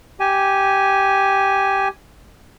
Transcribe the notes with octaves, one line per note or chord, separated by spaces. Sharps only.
G4 G#5